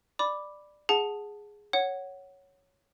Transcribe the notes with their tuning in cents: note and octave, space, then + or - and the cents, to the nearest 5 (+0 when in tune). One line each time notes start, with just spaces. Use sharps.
D5 +10 B5 +0 D6 +0
G#4 +0 F#5 -10 A5 +0
C#5 +0 F#5 +10